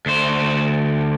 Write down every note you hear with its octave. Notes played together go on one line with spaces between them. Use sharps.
D2 C5